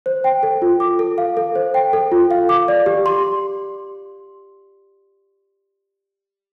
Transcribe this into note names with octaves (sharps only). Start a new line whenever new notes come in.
C5
G5
A4
F4
D6
A4
F5
A4
C5
G5
A4
F4
F5
D6
D5
G4
C6